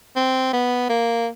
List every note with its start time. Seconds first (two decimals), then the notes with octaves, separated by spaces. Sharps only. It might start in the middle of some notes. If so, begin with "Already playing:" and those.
0.16 C4
0.53 B3
0.89 A#3